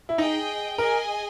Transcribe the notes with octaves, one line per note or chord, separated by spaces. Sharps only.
E4
D#4 G#4 D#5 G5
G#4 A#4 D#5 G#5